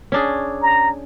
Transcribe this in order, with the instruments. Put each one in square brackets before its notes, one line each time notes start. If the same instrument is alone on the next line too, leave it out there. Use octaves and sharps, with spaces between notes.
[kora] C#4 D4 G#4
[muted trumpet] A#5